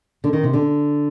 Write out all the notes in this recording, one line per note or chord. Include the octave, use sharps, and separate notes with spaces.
D3
D#3
C3
D3